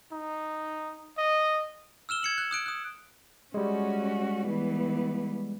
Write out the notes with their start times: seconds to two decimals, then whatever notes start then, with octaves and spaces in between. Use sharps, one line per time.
0.12 D#4
1.18 D#5
2.09 E6 F6 E7 G7
2.23 G#6 C#7 F#7
2.38 F#6
2.51 D#6 F#6 D7
2.66 D#6 F#6
3.54 G3 G#3 C#4 F#4
4.48 E3 B3